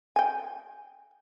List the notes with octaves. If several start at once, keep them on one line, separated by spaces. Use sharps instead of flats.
G5 G#5